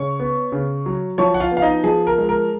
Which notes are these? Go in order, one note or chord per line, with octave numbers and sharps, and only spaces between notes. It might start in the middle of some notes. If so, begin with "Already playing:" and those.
Already playing: C#3 C#5 C#6
B3
C#3
F#3
F3 C#5 C#6
F#5
F4 F5
B3
F5
D#4 D#5
F3 G#4
A#4
G#3
A#4